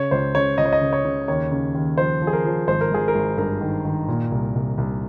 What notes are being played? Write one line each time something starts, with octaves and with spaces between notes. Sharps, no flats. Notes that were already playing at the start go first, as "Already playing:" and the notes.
Already playing: C#3 C#5
C#2 C5
C#3 C#5
C#2 D#5
C#5
D#5
C#3
C#5
C#3
D#2 C#5
C#3
D#2
F3 C5
F3
G#4
A#4
F3
G#1 C5
A#4
G#1 G#4
A#4
G#1
G2 A#4
D#3
D#3
A#2
C2
C2
C2